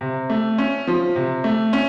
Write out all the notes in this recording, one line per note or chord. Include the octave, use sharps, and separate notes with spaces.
C3
A3
C#4
F3
C3
A3
C#4